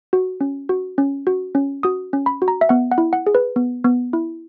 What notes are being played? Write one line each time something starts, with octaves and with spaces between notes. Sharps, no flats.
F#4
C#4
F#4
C#4
F#4
C#4
F#4 D#6
C#4
B5
F#4
A#5
E5
B3 F#5
F#5
E4
F#5
G#4
B4
B3
B3
E4